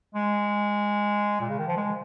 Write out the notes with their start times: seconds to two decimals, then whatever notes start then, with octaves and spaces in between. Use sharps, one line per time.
0.15 G#3
1.40 A#2
1.49 C#3
1.59 D#3
1.68 F3
1.77 G#3